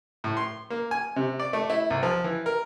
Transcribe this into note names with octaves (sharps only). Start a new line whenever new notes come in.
A2
C6
A#3
G#5
C3
D5
A3
E4
C2
F3
E3
A#4